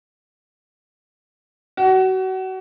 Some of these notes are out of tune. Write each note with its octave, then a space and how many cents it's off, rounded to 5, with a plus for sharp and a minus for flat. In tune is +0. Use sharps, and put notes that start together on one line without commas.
F#4 +30